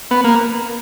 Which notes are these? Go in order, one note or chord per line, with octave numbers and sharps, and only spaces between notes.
B3
A#3